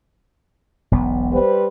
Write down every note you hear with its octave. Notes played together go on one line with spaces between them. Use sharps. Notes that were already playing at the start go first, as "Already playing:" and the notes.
E1 B1 B3
G3 B4 C5